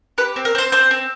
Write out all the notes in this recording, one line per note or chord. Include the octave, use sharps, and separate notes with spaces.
G4 B4
C4
A#4
C4 C5
C4 C5
C4